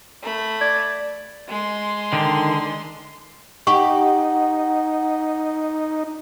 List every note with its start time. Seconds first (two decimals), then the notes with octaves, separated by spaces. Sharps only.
0.22 A3 B5
0.61 D5 G#6
1.48 G#3 C6
2.13 D3 D#3
3.67 D#4 G4 F#5 C#6